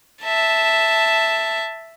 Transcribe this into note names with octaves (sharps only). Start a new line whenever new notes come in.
E5 A5